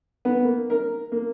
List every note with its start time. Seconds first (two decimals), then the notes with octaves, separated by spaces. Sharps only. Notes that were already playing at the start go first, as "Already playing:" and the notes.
0.25 B3
0.44 A#3
0.70 A#4
1.12 A#3